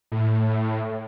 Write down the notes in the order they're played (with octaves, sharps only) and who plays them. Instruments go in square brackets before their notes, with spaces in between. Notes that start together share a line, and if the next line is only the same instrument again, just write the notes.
[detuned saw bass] A2